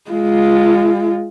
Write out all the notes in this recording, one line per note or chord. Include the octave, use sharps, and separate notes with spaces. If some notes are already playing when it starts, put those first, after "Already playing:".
G#3 F4